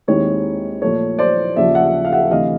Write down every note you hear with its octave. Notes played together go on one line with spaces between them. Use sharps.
D#2 D#3 G#3 C4 E4 C#5
A#2 F3 A3 C#5
C5 D5
D#2 C#3 F3 D5 E5
E5 F#5
F5
E5 F#5
D2 C3 E3 D#5 F5